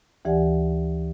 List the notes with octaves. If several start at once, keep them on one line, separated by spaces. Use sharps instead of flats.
D2 E3 G4 D5 F#5 G#5